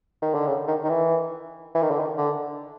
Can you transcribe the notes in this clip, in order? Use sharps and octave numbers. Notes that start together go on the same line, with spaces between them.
D#3
D3
C#3
D#3
D#3
E3
E3
D#3
D3
D#3
D3